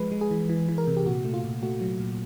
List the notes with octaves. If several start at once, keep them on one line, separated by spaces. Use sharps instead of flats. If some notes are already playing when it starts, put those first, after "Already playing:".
Already playing: F3 G#3 B4
G#3
G#4
E3
E3
E3
A#4
C3
G4
A#2 F#4
A3
F4
A#2
A3 F#4
F#3
A#2